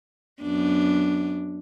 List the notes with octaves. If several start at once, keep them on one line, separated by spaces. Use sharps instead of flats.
F#2 B3 D4